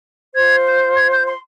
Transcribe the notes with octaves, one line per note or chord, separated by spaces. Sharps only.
F4 C5 G#6
G6
G#6
G6
C6